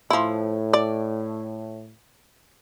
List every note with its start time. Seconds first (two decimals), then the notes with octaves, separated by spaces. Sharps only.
0.10 A2 F3 E4
0.73 D5